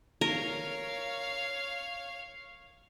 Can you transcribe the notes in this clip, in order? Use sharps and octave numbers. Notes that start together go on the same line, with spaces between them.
A#4 C#5 F5